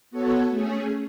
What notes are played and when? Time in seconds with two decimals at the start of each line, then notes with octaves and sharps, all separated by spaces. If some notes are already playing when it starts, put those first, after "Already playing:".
0.11 B3 F#4 A4 C#5
0.49 A3 C#4 G#4